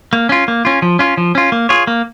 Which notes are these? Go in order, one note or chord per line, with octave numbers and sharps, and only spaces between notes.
A#3
C#4 F4
A#3
C#4 F4
F3
C#4 F4
F3
C#4 F4
A#3
F4 G#4 C#5
A#3